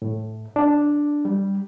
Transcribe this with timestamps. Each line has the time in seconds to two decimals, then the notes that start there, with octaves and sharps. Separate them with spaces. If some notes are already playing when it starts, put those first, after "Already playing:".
0.02 A2
0.56 D4
1.25 G3